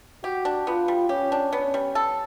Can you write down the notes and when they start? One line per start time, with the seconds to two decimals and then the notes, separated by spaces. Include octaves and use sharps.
0.24 F#4 G4
0.45 D4
0.67 B3 F4
0.88 G3
1.09 C#4 G4
1.32 D4
1.53 B3 C#4
1.74 G3
1.95 A4